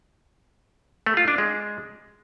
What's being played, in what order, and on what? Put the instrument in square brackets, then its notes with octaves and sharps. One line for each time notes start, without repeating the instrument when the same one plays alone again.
[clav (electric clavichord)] A3
F4
D4
G#3